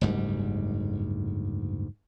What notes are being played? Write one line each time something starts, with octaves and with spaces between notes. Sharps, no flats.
F#1 D2 G#2 G3